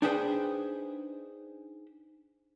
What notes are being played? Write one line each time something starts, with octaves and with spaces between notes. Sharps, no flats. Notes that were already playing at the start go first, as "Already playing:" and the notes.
D4 D#4 G#4 B4 C5 G5